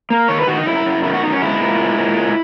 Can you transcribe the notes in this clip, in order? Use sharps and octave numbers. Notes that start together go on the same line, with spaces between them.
A#3
D#3 C#5
B4
D#3 F#4
D#4
F#2 E4
F#2
D#3 E4
F#4
F#2 D#4
C#4
G#3 E4
A#2
G#3
A#2
G#3